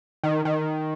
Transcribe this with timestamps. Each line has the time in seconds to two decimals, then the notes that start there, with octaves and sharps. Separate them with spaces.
0.24 D#3
0.45 D#3